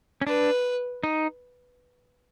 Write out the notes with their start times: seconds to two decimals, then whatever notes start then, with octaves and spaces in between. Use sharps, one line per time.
0.21 C#4
0.27 D4 B4
1.03 D#4